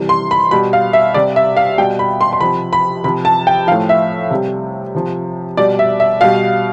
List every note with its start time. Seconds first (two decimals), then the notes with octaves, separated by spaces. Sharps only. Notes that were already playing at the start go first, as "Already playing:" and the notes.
Already playing: C3 E3 G3
0.09 C6
0.31 B5
0.51 B2 G3 B5
0.73 F5
0.93 E5
1.14 C3 G3 D5
1.36 E5
1.57 F5
1.78 B2 G3 G5
1.99 B5
2.21 C6
2.33 C6
2.41 C3 F3 B5
2.73 B5
3.04 C3 B5
3.08 F3
3.25 A5
3.47 G5
3.67 F3 F5
3.72 A2
3.89 E5
4.31 C3 G3
4.95 C3 F3
5.57 B2 G3 D5
5.79 E5
6.00 E5
6.21 B2 G3 F5